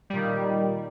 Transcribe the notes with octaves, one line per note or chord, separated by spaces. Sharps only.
A#2 D#3 G3